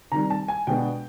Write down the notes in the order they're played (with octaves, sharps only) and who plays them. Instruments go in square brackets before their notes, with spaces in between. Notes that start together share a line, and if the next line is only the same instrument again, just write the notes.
[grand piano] C3 D#3 G3 A#5
A5
G#5
B2 G#3 B3 D4 G5